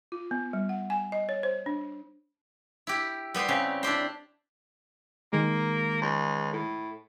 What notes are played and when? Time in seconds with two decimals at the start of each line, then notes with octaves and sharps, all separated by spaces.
0.12 F4
0.31 B3
0.53 G3
0.69 F#5
0.90 G#5
1.12 D#5
1.29 C#5
1.43 C5
1.66 D4
2.87 E4 G4
3.34 G3 B3 G4 B4 C5
3.48 C#3 G3 C4 C#4
3.83 D4 E4 G4 C5
5.33 D#3 G#3 A#3
6.02 C#2
6.53 A2